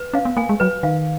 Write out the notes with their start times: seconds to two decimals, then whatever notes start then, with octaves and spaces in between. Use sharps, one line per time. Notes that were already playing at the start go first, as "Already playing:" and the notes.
Already playing: B4
0.13 C#4 F5
0.25 B3
0.37 A#3 G#5
0.49 G#3
0.60 F#3 B4
0.83 D#3 F5